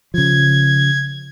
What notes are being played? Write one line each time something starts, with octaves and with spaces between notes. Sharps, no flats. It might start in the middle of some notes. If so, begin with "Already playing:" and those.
C#3 F3 G#6